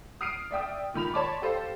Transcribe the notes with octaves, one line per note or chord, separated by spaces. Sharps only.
D#6 F6 C7 D7 D#7
D5 E5 G5 D#6
A#2 D#3 B5 F7
C#5 D5 A5 B5 C6 D6
G4 A4 C5 F5